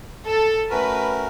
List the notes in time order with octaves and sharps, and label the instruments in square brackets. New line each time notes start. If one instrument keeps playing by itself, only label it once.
[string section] A4
[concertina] A3 C#4 F#4 A#4 [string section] B4